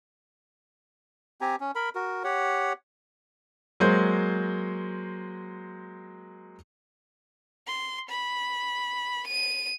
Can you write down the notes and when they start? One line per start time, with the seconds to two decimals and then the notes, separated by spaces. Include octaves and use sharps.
1.41 C4 G4 G#5 A#5
1.60 C#4
1.76 A#4 B5
1.95 F#4 A#4
2.24 G4 C#5 F#5
3.80 F#3 G#3 A#3 C5
7.67 C6
8.09 B5
9.27 D#7